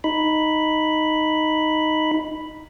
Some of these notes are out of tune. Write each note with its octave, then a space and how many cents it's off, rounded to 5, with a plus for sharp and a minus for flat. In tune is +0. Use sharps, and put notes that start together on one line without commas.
D#4 +0 B5 +0